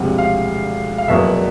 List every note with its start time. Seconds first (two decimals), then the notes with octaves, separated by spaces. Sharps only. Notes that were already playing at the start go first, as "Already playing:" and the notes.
Already playing: E1 D2 C3 F3 F#5
0.18 F5
0.98 F5
1.08 F1 E2 B2 F#3 A#3 E5